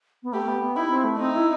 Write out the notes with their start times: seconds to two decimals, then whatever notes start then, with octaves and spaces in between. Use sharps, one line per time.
0.23 B3
0.33 A3 G4
0.48 B3
0.62 B3
0.76 D#4 E4
0.90 C4
1.04 A3
1.19 C4 D#4
1.33 E4